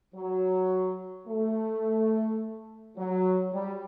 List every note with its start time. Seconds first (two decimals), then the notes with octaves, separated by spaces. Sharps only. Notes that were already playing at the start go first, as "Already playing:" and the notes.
0.15 F#3
1.27 A3
2.97 F#3
3.54 G3